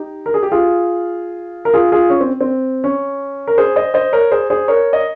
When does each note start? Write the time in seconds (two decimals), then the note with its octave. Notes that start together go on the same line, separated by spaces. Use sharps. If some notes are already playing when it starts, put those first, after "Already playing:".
Already playing: D#4 G4
0.26 A#4
0.34 G#4
0.43 G4
0.52 F4 G#4
1.65 A#4
1.74 F4 G#4
1.92 F4 G#4
2.10 C#4
2.21 C4
2.41 C4
2.84 C#4
3.48 A#4
3.58 G#4 C5
3.76 C5 D#5
3.94 C5 D#5
4.12 A#4 C#5
4.32 G#4 C5
4.50 G#4 C5
4.68 A#4 C#5
4.93 D#5